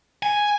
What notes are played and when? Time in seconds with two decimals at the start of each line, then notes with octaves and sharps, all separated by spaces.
0.23 G#5